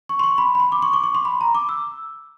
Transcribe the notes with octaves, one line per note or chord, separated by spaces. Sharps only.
C#6
C6
C#6
B5
B5
C6
D6
C#6
D6
C#6
C6
B5
A#5
D6
E6